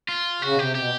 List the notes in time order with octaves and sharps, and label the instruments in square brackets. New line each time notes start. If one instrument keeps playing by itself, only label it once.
[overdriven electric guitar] F4
[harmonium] C#3 [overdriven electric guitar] F#4
[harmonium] B2
[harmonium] C3 [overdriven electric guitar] G4
[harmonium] B2 [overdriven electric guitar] G4